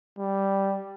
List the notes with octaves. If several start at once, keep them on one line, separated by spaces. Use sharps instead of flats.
G3